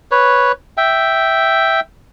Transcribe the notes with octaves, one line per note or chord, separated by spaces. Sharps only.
B4 C#5
E5 G5